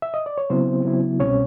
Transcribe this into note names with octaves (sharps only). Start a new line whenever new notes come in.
E5
D#5
D5
C#5
C#3 F#3 B3 C4 E4 C5
C#3 F#3 B3 E4
C2 B2 G3 C4 C#4 C#5